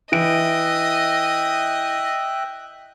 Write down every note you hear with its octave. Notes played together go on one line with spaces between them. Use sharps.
E3 D#5 E5 G5 F#6 D7